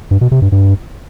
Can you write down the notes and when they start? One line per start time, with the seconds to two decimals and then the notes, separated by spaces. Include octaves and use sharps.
0.11 G2
0.21 B2
0.31 C3
0.42 G2
0.52 G2